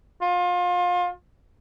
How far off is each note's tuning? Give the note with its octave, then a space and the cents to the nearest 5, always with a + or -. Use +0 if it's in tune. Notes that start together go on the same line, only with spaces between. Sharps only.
F4 +30